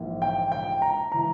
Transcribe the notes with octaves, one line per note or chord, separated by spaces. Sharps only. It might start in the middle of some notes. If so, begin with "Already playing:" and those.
Already playing: A#1 G#2 E3 A#3
G5
G5
A#5
E3 A#5